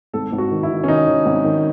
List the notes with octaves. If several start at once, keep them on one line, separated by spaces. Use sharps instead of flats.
G#1 A4
G#1
F#4
D#3
E4
D#3
C#4
D#3 D#4
D#3
G#1
D#3